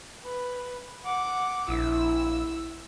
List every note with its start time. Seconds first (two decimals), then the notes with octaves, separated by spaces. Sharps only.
0.24 B4
1.03 F#5 D6
1.69 A#1 E4 E6